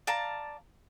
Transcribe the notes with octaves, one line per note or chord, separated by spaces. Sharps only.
D5 F5 A5 A#5